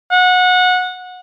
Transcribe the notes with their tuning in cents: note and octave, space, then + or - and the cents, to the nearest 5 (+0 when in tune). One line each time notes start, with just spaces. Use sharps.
F#5 -20